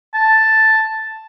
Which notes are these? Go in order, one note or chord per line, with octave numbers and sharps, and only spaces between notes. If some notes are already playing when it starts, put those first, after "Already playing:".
A5